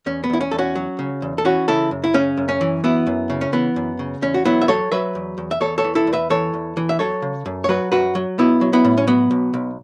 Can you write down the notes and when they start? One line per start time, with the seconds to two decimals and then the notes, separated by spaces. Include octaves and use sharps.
0.06 E2 C#4
0.24 B3
0.30 E2 E4
0.41 C#4
0.51 E2 A4
0.58 C#4 F#4
0.75 F#3
0.99 C#3
1.22 E2
1.38 A4
1.45 E3 C#4 F#4
1.68 C#3 E4 A4
1.91 F#2
2.04 E4
2.14 C#3 C#4
2.37 F#2
2.49 C#4
2.61 E3
2.84 F#2 B3 E4
3.07 F#2
3.30 C#3
3.41 C#4
3.53 E3 B3
3.76 F#2
3.99 C#3
4.22 E2 C#4
4.34 F#4
4.45 F#3 B3 E4
4.62 E5
4.68 F#3 A4 C#5
4.92 F#3 B4 E5
5.15 E2
5.38 E2
5.51 E5
5.60 E2 A4 C#5
5.78 A4 C#5
5.84 E3
5.95 E4 A4
6.07 E2
6.13 B4 E5
6.30 E3 A4 C#5
6.54 E2
6.77 E3
6.89 E5
6.99 F#3 A4 C#5
7.22 C#3
7.46 F#2
7.64 C#5
7.69 F#3 F#4 B4
7.92 F#2 F#4 B4
8.15 F#3
8.38 B1 B3 E4
8.61 F#3
8.73 B3 E4
8.85 A2
8.97 C#4
9.07 F#3 B3
9.31 B1
9.54 B1